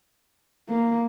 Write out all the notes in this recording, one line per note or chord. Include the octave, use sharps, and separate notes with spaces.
A#3